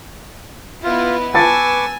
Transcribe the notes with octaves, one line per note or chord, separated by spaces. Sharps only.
B3 E4 F4 D#5
B3 B4 G#5 A5 C#6 D6 E6 A6